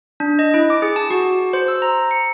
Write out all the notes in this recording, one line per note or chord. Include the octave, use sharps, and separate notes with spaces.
D4
D#5
E4
D6
G#4
A5
F#4
C5
E6
A#5
C#7